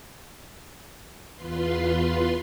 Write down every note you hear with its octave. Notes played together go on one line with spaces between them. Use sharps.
E2 F4 B4 C6